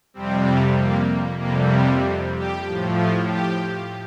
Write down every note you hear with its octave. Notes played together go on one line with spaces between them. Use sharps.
F2 C3 G3 C4
A#3
F2 C3 G3 A#3
C4
G4
A2 F3
F4
G4